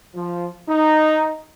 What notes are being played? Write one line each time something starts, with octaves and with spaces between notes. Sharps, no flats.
F3
D#4